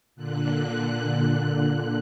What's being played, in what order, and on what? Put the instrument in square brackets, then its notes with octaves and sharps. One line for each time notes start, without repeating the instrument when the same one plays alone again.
[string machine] A#2 D3 F#6